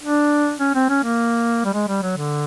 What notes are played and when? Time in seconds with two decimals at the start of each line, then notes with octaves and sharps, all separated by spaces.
0.03 D4
0.59 C#4
0.75 C4
0.89 C#4
1.04 A#3
1.65 G3
1.74 G#3
1.88 G3
2.02 F#3
2.17 D3